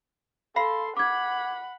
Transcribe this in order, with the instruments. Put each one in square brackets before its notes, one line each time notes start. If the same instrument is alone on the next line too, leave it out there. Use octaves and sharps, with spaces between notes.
[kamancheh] A4 C6 [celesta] F5 B5 C7
[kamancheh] F#5 B5 [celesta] D6 G#6